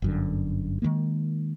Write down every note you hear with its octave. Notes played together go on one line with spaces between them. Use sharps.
G1 F#2 D3
D#3 F3 G#3 A#3